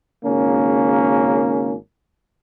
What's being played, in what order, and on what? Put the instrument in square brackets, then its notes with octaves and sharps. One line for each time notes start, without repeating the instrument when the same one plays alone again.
[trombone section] G#1 C#3 A#3 C#4